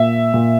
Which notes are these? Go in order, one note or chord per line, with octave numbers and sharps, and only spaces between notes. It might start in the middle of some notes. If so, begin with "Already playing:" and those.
Already playing: A#2 E5
A#2